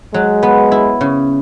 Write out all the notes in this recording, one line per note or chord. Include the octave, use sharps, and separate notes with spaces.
F#3 G#3
B3
E4
C#3